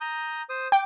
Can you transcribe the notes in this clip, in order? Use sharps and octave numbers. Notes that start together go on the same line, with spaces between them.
A#5 D#6 G6
C5 D#6
G5 D6